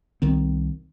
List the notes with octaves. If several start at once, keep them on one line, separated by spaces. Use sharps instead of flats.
C2 D#3 C4